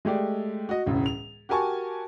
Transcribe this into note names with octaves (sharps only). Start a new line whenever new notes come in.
G#3 A3 G4 D5
F#4 D#5
E1 C#2 A2 C#3
F7
F#4 G4 A#4 G#5 A5 C#6